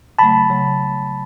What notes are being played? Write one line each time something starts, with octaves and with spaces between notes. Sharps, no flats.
C#3 F#3 A3 A5 B5
C#3 F#3 A3